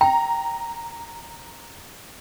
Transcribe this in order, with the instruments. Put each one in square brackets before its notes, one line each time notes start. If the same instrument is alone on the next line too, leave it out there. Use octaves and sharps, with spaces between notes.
[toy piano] G5 [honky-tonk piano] A#5